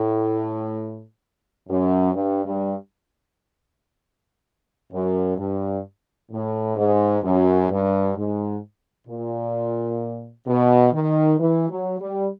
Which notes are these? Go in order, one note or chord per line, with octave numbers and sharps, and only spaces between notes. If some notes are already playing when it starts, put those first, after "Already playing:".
Already playing: A2
F#2
G2
G2
F#2
G2
A2
G#2
F#2
G2
G#2
A#2
B2
D#3
E3
F#3
G3